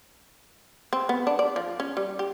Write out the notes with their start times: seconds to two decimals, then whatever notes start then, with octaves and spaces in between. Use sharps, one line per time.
0.93 C4
1.09 B3
1.27 D4
1.39 D5
1.56 F3
1.80 C#4
1.97 G3
2.19 G4